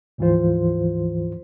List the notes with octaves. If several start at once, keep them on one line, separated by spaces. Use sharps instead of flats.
D2 G#2 E3 F3 F4 C5